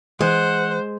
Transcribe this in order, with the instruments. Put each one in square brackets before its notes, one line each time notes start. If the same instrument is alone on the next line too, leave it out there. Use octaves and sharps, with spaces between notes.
[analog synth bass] E3 [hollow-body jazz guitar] G#3 [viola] C5 [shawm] F#5